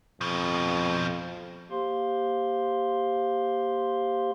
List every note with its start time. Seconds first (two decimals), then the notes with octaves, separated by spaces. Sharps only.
0.21 F2 B2 F3
1.70 A#3 G4 C5 F5 C6